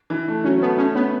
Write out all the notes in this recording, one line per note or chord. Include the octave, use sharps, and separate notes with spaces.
E3
A3
F#3 C#4
A3 B3
A3 C#4
B3 C#4